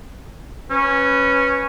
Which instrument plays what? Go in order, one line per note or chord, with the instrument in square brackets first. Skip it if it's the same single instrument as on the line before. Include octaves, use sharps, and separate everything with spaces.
[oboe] C#4 [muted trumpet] B4